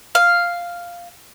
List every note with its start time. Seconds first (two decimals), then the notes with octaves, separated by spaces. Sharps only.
0.15 F5